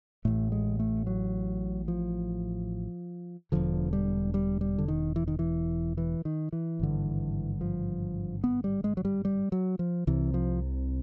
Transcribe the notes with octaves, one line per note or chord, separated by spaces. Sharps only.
A1 A2 A3
G#3
A3
F#3
F3
E1 D#2 D3 F3
G3
G3
G3
D3
D#3
E3
D#3
E3
E3
D#3
E3
G#1 G2 D3
F3
B3
G3
G#3
F#3
G3
G3
F#3
F3
C2 C3 E3
F3